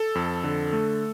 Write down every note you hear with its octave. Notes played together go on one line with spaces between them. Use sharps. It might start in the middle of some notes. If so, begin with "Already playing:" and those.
Already playing: A4
F2
D3
A3